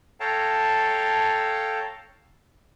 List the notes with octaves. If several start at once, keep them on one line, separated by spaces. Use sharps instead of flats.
A4 C#5 F5 G5 A5 A#5